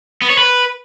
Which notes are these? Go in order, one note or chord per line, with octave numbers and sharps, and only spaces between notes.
B3
C#5
B4